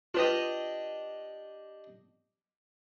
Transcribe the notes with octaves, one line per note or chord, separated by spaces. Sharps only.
D4 F4 G4 B4 D#5 D#7